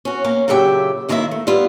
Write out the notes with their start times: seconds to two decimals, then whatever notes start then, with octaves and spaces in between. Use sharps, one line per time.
0.05 C#4 F#4
0.24 A#3 C#4
0.48 A#2 C#3 F#3 G4 E5 G5
1.09 F#2 D#3 A#3 E4 A#4 E5
1.31 A3
1.47 G3 B3 E4 F4